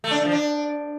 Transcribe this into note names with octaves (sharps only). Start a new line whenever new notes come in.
A3
D4
A3
F3
D4